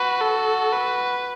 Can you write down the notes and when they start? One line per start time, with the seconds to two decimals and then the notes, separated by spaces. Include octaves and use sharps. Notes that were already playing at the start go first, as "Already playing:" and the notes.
Already playing: F#4 B4
0.21 A4
0.72 B4